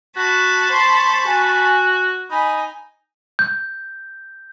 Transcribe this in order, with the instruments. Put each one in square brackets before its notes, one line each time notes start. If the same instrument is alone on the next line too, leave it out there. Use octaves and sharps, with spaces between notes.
[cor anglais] F#4 [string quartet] A5 B5 C#6
[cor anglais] C5 [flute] C6
[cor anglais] F#4 [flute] G#5
[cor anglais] D#4 [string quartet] G#5 [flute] B5
[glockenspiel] G6